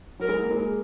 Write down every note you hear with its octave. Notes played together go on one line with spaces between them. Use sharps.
F#3 A#4
G#3
A#3
G#3